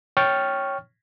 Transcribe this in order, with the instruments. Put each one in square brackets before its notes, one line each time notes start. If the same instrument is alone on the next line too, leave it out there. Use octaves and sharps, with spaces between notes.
[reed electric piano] C#5 G5 C#6 F6 A6